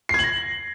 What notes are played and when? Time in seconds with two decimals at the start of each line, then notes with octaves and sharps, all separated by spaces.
0.09 C7
0.14 G#6
0.19 F#7
0.24 A#6